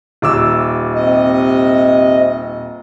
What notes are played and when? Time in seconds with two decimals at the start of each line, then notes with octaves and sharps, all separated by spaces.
0.22 D#1 D6 E6
0.95 C3 D#5